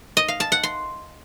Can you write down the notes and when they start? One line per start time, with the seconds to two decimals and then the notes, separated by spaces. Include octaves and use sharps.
0.17 D#5
0.28 F5
0.40 A5
0.52 F#5
0.63 C6